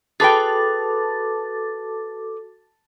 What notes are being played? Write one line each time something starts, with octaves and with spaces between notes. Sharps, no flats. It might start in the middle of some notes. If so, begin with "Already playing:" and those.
F#4 G#4 A4 B4 G5 A5 D6 A6